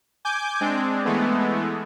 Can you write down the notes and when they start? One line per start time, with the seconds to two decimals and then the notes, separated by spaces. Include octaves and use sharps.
0.25 G#5 D6 G6
0.60 G#3 C4 D4
1.05 E3 G#3 A3 B3